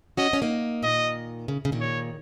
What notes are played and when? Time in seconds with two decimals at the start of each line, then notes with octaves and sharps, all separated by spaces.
0.17 C#4 F#4 D#5
0.33 C#4 F#4
0.42 A#3 D#4
0.83 A#2 D#3 D#5
1.48 C#3
1.65 C#3
1.72 A#2 D#3
1.80 C#5